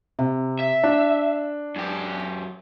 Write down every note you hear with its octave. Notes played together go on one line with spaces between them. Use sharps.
C3
E5
D4
F#2 G4